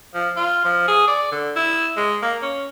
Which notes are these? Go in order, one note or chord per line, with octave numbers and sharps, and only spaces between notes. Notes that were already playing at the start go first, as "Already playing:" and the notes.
F3
F4
F3
G#4
D5
D3
E4
G#3
A#3
C#4